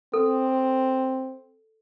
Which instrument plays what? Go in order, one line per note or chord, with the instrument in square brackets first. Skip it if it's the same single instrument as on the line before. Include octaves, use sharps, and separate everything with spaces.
[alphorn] C4 [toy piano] A4